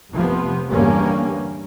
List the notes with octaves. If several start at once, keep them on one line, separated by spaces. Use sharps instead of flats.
F1 C3 F3 B3
E2 G2 D3 G3 A#3 C#4